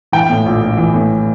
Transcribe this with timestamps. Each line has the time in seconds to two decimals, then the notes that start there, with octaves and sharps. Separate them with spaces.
0.12 E3 G5
0.29 A2
0.46 A#1
0.61 A#1
0.77 E3
0.94 A2